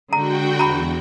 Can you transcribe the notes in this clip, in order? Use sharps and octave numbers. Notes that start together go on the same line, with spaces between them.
D3 G#3 F#4 G5 A#5
E2 A#5 B5